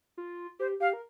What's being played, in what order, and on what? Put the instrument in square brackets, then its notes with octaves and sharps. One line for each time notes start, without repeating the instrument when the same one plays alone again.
[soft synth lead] F4
[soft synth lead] G4 [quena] C5
[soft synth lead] G4 [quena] F5
[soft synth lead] A#4